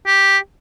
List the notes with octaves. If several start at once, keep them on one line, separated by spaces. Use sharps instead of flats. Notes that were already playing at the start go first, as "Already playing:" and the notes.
G4